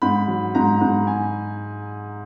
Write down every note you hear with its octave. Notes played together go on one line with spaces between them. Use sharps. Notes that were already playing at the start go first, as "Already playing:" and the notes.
G#2 B5
F#3
G#2 A#5
G#2
G#5